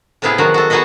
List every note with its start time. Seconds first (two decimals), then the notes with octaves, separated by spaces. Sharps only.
0.22 A2 C3 B3 E4 G#4 F5
0.38 D#3 F3 F#3 F#4
0.54 F#4 A4
0.70 B3 D#4 F#4 G#4 B4 D#5